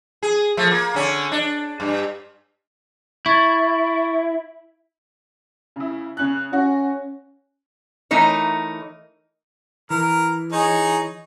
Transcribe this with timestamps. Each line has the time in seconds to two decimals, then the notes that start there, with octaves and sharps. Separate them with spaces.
0.23 G#4
0.57 F3 A3
0.71 A#3
0.94 D3 C#4
1.32 D4
1.80 G2
3.26 E4 C#6 G#6 A6
5.76 C#3 E4
6.17 C#3 C#4 F#6
6.53 C#4 F#4
8.11 E3 A3 D#4 A#4 C#5
9.90 E3 A#4
10.52 D#4 G#4 C#5